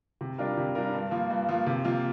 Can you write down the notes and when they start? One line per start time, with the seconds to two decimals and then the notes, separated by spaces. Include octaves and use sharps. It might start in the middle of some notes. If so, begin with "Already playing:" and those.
0.21 C3
0.38 G3 D4 F4 A#4
0.57 C3
0.75 G3 D4 F4 A#4
0.94 G2
1.11 F3 A#3
1.30 G2
1.49 F3 A#3
1.67 C3
1.84 F3 A#3 F4